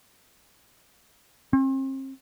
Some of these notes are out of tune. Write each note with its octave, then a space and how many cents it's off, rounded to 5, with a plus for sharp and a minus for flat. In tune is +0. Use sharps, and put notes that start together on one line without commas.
C4 +40